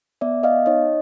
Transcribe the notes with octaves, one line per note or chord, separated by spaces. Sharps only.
B3 D5 E5
D#5 F5
D#4 C#5 D#5